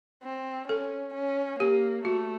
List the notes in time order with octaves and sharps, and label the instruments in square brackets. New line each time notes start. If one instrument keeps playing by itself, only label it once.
[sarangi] C4
[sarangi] C#4 [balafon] A4
[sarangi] C#4
[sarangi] A#3 [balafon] G4
[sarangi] A3 [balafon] F#4